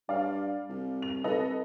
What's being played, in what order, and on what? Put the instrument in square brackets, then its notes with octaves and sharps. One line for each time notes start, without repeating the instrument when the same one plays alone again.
[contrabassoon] G2 [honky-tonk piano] D5 F5
[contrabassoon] C2
[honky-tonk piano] F7
[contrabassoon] C2 [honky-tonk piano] A4 B4 D#5